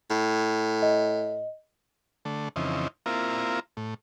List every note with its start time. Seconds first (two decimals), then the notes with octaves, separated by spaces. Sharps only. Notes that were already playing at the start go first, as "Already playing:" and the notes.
0.10 A2
0.82 D#5
2.25 D3 A3
2.56 F2 C#3 E3 C4 D#4
3.06 A#3 C4 E4 F4 A#4
3.77 A2